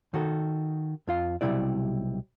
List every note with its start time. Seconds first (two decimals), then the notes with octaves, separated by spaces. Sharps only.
0.14 D#3 F#4 A4
1.07 F2 F4 F5
1.41 B1 F2 C3 G3 E4 D5